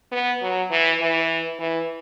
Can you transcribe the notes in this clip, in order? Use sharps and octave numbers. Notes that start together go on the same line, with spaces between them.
B3
F#3
E3
E3
E3